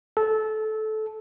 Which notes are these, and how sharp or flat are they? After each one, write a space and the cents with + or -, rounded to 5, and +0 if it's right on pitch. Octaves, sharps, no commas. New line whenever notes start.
A4 -15